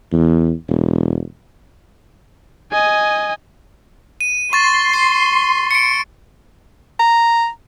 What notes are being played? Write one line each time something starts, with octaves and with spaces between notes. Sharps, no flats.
E2
E1
D#5 G#5
D#7
C6 C#6 A6
C7
C#7 D7
A#5